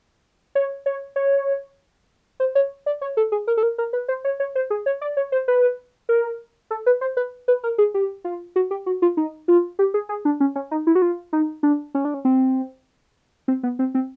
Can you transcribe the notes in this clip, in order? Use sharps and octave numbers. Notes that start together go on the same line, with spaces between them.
C#5
C#5
C#5
C5
C#5
D5
C#5
A4
G#4
A#4
A4
A#4
A#4
B4
C5
C#5
C#5
C5
G#4
C#5
D5
C#5
C5
B4
A#4
A4
B4
C5
B4
B4
A#4
G#4
G4
F4
F#4
G4
F#4
F4
D#4
F4
G4
G#4
G#4
D4
C#4
C#4
D#4
E4
F#4
F4
D#4
D4
C#4
D4
C#4
C4
C4
B3
C4
C4